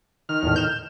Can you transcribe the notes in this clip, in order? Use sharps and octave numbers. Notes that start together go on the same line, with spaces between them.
D#3 F6
E2 A2
G6 E7